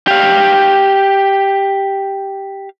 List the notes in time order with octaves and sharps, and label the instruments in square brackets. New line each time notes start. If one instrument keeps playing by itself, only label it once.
[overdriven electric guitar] G4 F5